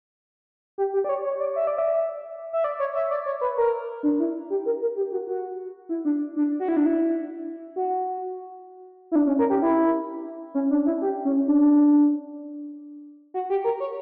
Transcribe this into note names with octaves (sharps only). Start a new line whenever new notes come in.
G4
G4
D5
C#5
C#5
D5
E5
D5
E5
E5
D5
C#5
E5
D5
C#5
B4
A#4
D4
E4
G4
A#4
A#4
G4
F#4
F#4
E4
D4
D4
F#4
E4
D4
E4
F#4
E4
D4
C#4
A#4
G4
E4
C#4
D4
E4
G4
C#4
D4
F#4
G4
A#4
C#5